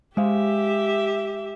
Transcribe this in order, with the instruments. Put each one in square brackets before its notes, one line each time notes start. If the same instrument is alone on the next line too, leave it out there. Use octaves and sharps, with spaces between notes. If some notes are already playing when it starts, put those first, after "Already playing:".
[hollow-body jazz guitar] G#3 C5 F5 [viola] G4 E5